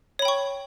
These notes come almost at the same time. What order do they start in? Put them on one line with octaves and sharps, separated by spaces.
C#5 B5 G5 C#6